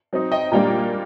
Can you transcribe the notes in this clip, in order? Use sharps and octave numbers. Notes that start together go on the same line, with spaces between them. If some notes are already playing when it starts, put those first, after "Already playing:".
F#3 C4 D#4
D#5 G5
A#2 G3 A#3 D4 G5 A#5